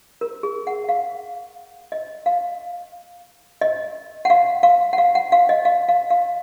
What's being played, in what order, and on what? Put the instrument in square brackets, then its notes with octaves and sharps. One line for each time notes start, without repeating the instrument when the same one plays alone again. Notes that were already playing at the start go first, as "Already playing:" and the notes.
[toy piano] A#4
G#4
F#5
F#5
F5
D#5
F5
D#5
F#5
F5
F5
F#5
F5
F#5
F5
D#5
F5
F5
F5